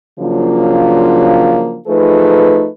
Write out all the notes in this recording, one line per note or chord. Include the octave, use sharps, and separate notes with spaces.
C#3 F3 F#3 A#3 D4 F4
F3 A3 D#4 G#4 B4